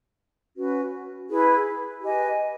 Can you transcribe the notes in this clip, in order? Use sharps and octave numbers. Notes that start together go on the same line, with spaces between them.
C#4 F#4 B4
E4 G#4 B4
G4 B4 D#5 G#5